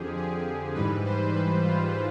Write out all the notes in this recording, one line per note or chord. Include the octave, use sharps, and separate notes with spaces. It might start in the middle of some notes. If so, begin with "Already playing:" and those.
Already playing: F2 D3 F3 G4 G#4
G#4
G#2 E3 G3 B4
C5
B4
F4